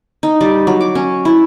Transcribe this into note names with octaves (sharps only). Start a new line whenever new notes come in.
D#4
G3
F#3
D6
C#4
E4